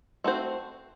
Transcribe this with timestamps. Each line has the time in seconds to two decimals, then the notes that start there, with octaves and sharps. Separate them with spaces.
0.24 A3 C4 F#4 C5